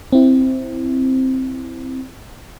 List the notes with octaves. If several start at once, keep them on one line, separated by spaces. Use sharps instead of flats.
C4 E4